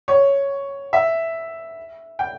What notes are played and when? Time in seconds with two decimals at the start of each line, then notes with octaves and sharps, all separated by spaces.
0.08 C#5
0.93 E5
2.19 G5